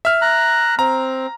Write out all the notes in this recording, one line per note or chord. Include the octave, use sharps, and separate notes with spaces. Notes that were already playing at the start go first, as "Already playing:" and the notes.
E5 F6
A#5 F#6
C4 A#5